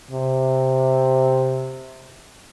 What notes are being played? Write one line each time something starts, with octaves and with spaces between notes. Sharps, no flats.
C3